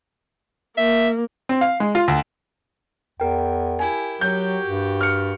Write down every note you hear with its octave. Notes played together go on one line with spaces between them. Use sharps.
A#3 E5
C4
F5
G#3
F4
D2
E2 A#4 G5
E4 G4 G#5
F#3 F#4 G4 G6
G2
F6 C#7